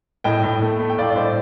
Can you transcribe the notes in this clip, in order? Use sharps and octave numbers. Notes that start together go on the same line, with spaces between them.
A2 D#5 G5
A2
A3
A3
G5
A2 D5 F5
D5
A2 C5 D#5